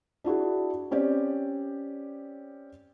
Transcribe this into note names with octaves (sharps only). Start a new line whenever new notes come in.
D4 E4 F#4 G#4
C4 C#4 G4 D5